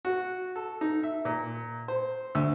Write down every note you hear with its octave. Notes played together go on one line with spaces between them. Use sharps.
F#4
A4
D#4
E5
A#2
C5
D2